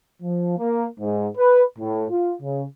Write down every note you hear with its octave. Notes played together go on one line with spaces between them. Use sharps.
F3
A#3
G#2
B4
A2
F4
C#3